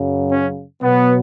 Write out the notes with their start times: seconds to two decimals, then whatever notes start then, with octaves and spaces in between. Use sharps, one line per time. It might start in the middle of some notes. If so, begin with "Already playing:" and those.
Already playing: F#2 C#3 F#3
0.32 C#4
0.83 B2 F#3 B3